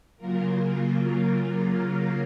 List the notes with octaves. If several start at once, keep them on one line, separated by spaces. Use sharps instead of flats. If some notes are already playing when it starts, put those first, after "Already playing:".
C#3 F#3 A#3 F4 A#4